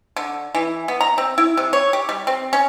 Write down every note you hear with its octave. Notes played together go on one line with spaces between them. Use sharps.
D3
E3
B3
A#5
C4
E4
C3
C#5
G4
G3
C4
C#4